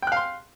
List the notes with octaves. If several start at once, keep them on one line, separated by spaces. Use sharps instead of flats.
F5 G5 C6 F#6